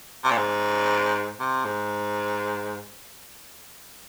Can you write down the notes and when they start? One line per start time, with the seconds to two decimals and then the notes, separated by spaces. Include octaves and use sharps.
0.24 C3
0.31 A#2
0.38 G#2
1.40 C3
1.65 G#2